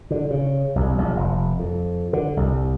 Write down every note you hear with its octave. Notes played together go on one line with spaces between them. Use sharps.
D3
C#3
C2
A#1
F1
F2
D3
C2